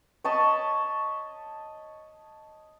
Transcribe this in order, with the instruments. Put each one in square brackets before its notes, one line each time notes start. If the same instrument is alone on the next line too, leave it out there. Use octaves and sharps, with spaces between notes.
[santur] C#5 D#5 A5 B5